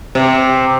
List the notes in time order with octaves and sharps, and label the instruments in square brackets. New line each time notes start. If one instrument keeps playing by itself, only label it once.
[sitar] C3